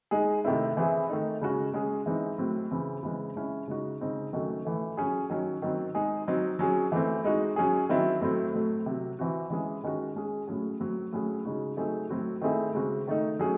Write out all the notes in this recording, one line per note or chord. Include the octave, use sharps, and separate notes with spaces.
G#3 D#4 G#4
C3 D#3 A3 C4 E4
E3 C4 E4 G#4
D#3 A3 D#4
C#3 G#3 C#4 F#4
G#3 C#4 G#4
E3 G#3 C4 D#4
A2 F#3 C4
C#3 E3 C4
C#3 E3 G#3 C4
G#3 C#4 E4
C#3 G#3 D#4 F#4
C#3 G#3 C4 D#4
D#3 F#3 A3 C#4 F#4
A2 E3 A3
F#3 C#4 G#4
D#3 F#3 C#4
D#3 F#3 C4
G#3 D#4 G#4
F#3 C4 D#4
F#3 C#4 G#4
E3 A3 C4
G#3 D#4 F#4
F#3 C#4 G#4
D#3 F#3 C4 E4
A2 F#3 A3 C4
A2 F#3 A3
C3 F#3 C4
E3 C4 F#4
E3 G#3 C#4 G#4
D#3 G#3 C#4 F#4
G#3 C#4 G#4
A2 F#3 C#4 G#4
A2 F#3 C4 F#4
A2 F#3 C#4 G#4
C#3 G#3 D#4 F#4
F#3 A3 C4 D#4 G#4
A2 F#3 C4 F#4
D#3 A3 C4 E4 G#4
C#3 G#3 C4 F#4
D#3 A3 D#4
F#3 A3 C#4 G#4